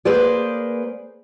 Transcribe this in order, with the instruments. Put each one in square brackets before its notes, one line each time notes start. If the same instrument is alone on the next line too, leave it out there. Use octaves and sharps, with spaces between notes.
[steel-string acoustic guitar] A#3 G#4 B4 C5 D5